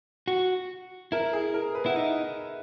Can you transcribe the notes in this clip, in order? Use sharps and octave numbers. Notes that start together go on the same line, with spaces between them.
F#4
E4 A#4
G#4
A#4
B4
E4 F#5
D#4 E5